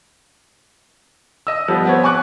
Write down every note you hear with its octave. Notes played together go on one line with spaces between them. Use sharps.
D#5 E6
F3 G3 B3 F4
B3 C4 C#5
G#5 C#6 D6 F#6